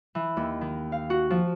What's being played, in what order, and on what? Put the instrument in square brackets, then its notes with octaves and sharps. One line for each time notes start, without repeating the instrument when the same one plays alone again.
[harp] E3
D#2
D#3
F5
F#4
F3